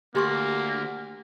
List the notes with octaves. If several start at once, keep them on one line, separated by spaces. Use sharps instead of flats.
D2 A#3 G4 C6 C#6